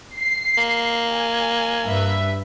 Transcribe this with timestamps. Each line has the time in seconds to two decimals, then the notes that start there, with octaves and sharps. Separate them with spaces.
0.15 C7
0.57 A#3
1.12 G#5
1.86 G2 B4 E5